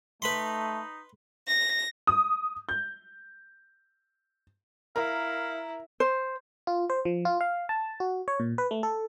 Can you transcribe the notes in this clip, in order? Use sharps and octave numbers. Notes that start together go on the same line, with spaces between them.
A3 D#4 B4 B5 C6
A#6
D#6
G6
E4 A#4 F5
C5
F4
C5
F3
F4
F5
A5
F#4
C#5
A#2
B4
A3
A4